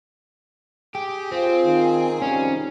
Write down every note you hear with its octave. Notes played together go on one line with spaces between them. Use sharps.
G4 G#4
C4 F4
D#3
F2 C3 G3 C#4 D#4